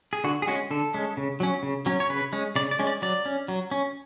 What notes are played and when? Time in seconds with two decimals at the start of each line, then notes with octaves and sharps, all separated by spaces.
0.13 G#4
0.24 D3 F#4
0.42 G#4
0.47 G#3 C#4 F#4
0.71 D3 A4
0.94 G#3 C#4
1.17 C#3
1.40 F#3 C#4
1.63 C#3
1.86 F#3 C#4
2.00 C#5
2.09 C#3 B4
2.33 G#3 C#4
2.56 C#3 D5
2.71 D5
2.79 G#3 C#4
2.87 D5
3.02 F#3 D5
3.26 C#4
3.48 F#3
3.71 C#4